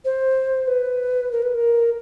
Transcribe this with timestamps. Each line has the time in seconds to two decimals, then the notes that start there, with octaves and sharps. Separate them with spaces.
0.04 C5
0.67 B4
1.31 A#4
1.42 B4
1.54 A#4